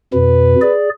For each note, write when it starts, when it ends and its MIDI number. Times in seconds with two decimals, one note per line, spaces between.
0.14 0.55 41
0.14 0.55 47
0.14 0.73 71
0.62 0.90 68
0.62 0.90 74